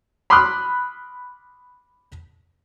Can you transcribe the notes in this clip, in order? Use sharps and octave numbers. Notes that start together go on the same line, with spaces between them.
B5 C6 D6 D#6 F6 F#6